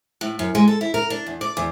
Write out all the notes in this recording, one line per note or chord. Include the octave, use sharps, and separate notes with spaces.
A2
F#2
G#3
A4
E4
A#4
D4
E2
D5
E2